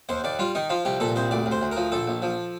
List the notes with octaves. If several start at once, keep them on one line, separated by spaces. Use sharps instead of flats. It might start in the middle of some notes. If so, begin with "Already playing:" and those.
D#2 C5
D#2 D5
G3 F4
D#3 D#4
F3 F4
C2 G4
A#2 A4
C2 C5
D2 D5
D2
C5
D2
A#4
F3
A#1 A4
A#1
F3